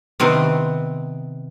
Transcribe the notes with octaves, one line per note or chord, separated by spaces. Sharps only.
C3 D#3 B3 C4